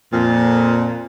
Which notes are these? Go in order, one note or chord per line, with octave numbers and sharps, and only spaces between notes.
F2 A#2